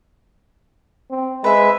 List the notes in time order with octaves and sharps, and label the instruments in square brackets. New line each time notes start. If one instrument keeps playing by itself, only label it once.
[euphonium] C4
[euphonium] G#3 [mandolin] B4 E5